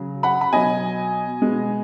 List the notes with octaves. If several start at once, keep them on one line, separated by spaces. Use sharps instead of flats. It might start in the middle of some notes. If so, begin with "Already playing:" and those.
Already playing: C#3 F#3
F#5 B5
B5
B2 F#3 D#5 G#5
B2 G#3